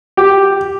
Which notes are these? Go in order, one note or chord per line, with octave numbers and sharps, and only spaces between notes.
G4